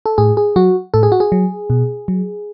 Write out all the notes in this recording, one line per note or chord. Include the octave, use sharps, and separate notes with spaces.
A4
A2 G#4
G#4
F#3 F#4
A2 A4
G#4
F#4
G#4
F#3
B2
F#3